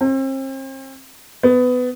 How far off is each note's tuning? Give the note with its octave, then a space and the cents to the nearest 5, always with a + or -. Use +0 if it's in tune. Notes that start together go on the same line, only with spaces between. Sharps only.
C4 +40
B3 +20